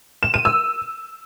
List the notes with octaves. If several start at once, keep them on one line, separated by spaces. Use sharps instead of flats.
E7
D#7
E6